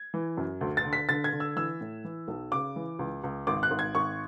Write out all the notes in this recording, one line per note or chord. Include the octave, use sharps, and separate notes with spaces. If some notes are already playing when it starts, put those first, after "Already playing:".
Already playing: G#6
E3
F#2
D2
A6
D3
B6
D3 A6
G#6
D3
E6
E3 E6
A2
E3
B1
C#3 D6
E3
C#2
C#2
G#1 D6
F#6
G#1
G#6
G#1 C#6